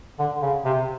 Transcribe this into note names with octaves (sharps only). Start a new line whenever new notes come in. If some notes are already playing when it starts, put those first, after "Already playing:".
D3
C#3
C3